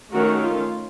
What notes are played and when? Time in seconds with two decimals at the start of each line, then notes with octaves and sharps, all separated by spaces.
0.12 D#3 A3 C#4 F#4 A#4
0.42 F4